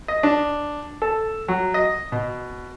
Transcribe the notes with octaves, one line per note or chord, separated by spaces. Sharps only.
D#5
D4
A4
F#3
D#5
B2